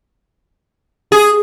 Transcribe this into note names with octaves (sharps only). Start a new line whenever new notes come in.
G#4